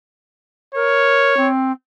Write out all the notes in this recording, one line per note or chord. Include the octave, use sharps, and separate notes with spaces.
A#4 C#5
C4